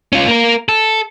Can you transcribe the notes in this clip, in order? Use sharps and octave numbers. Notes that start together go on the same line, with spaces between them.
C#4 F4
A#3 A#4
A4